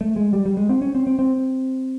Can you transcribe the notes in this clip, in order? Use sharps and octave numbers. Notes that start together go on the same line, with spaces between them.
A3
G#3
G3
G3
G#3
C4
C#4
C4
C4
C4